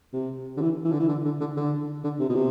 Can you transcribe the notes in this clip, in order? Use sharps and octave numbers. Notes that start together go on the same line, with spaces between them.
C3
D3
E3
E3
D3
E3
D3
D3
D3
D3
D3
C3
B2
C3